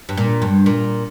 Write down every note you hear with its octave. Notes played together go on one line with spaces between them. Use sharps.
G2
A#2
G2
A#2